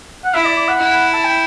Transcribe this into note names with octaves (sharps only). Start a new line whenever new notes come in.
F#5
E4 E5
D5
D5
F#5
E4
A5
G5